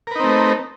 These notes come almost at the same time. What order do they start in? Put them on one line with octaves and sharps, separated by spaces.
A#4 B4 D#4 C4 A3